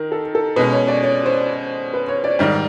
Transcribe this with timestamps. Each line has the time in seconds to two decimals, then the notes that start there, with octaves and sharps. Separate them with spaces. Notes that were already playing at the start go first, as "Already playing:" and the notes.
Already playing: D#3 A#4
0.12 A4
0.35 A4
0.56 B2 G#3 C#4 B4
0.72 C#5
0.88 D5
1.03 C#5
1.26 C5
1.94 B4
2.08 C#5
2.24 D5
2.39 G#2 D#3 G3 D5